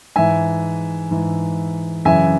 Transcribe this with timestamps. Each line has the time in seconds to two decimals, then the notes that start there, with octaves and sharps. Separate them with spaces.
0.16 G#2 E3 E5 G#5
1.11 G#2 E3
2.05 F#2 C#3 E3 E5 G#5